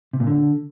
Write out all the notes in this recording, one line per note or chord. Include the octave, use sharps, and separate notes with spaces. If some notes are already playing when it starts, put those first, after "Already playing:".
C3
A#2
D3